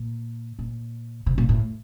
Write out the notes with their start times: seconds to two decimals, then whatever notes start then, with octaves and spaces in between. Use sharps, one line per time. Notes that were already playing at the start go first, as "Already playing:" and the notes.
Already playing: A#2
0.59 A#2
1.26 C3
1.38 A#2
1.49 A2